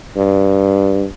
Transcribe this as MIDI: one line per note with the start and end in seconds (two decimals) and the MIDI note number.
0.17 1.04 43